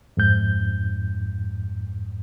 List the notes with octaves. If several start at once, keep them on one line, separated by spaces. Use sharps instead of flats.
F2 G#2 G6